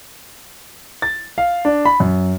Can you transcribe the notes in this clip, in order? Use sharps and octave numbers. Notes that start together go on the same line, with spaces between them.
A6
F5
D4
B5
F#2